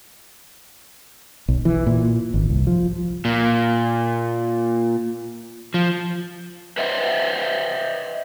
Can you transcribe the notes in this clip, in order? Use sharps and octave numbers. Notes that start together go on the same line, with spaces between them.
B1
E3
A#2
G#1
C2
F3
A#2
F3
B4 C5 D#5 E5